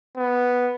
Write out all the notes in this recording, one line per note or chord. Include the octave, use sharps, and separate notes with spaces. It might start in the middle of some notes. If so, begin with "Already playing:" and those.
B3